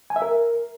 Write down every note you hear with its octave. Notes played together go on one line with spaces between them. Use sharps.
G#5
E5
A#4